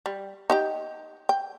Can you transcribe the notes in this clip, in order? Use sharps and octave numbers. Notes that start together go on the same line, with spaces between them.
G3
D#4 G4 G5
G5